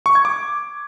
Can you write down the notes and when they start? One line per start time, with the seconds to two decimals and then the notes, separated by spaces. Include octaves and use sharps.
0.06 C#6
0.15 G#6
0.25 D6